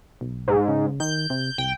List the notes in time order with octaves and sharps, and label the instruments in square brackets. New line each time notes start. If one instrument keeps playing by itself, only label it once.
[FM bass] B1
[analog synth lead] G#2
[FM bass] C#3
[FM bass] D#3 [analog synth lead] G6
[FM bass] C3
[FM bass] C2 [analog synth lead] G5